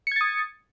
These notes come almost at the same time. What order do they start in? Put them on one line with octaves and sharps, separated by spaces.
C#7 G#6 A6 D#6